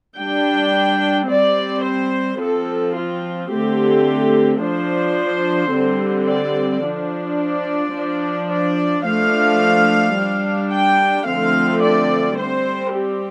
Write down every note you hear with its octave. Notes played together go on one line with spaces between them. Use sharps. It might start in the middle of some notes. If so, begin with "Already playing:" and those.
G3 D4 G5
G3 C4 D5
C5
F3 C4 A4
F4
D3 A3 C4 G4
F3 D4 C5
D3 G3 C4
D5
F3 D4
D5
F3 D4
D5
F3 A3 D4 F5
G3 D4
G5
D3 F3 A3 C4 F5
D5
G3 C4 C5
G4